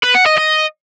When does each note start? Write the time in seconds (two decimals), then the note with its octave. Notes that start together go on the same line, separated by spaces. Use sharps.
0.03 B4
0.15 F#5
0.26 D#5
0.38 D#5